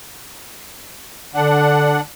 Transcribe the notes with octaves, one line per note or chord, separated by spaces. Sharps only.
D3 D4 F#5